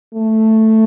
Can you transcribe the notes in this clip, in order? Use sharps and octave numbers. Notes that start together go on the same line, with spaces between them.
A3